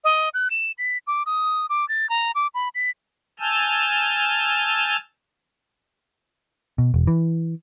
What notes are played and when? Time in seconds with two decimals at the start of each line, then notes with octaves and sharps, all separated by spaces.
0.04 D#5
0.34 F#6
0.50 E7
0.78 B6
1.07 D6
1.26 D#6
1.70 D6
1.89 A6
2.09 A#5
2.35 D6
2.54 B5
2.75 B6
3.40 G#5 A5 E6 F6 G6
6.78 B2
6.94 E1
7.07 E3